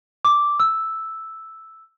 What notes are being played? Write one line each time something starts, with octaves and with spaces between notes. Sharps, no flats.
D6
E6